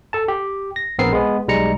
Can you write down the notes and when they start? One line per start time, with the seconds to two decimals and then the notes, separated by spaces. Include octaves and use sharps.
0.13 A4 A5
0.28 G4
0.76 A#6
0.98 A#1 B3 C4 A#4 C7
1.13 G#3 B3
1.48 B1 G3 G#3 A#5 C#7